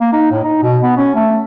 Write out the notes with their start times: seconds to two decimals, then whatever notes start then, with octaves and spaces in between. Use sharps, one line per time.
0.01 A#3
0.13 D#4
0.31 A2
0.44 D#4
0.63 B2
0.83 B3
0.97 C#4
1.15 A3